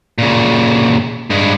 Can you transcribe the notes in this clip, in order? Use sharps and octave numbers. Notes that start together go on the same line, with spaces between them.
A#2 C#3
G2 G#3